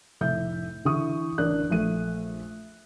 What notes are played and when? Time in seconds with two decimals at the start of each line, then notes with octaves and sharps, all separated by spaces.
0.21 F1 A2 E5 G6
0.85 D3 E3 E4 C#6 D#6
1.38 A1 D4 A#4 D5 F#6
1.70 A#1 A3 D#7